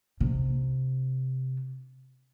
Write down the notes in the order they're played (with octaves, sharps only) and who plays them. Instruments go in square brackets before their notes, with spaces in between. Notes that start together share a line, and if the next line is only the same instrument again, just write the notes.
[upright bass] C3 D4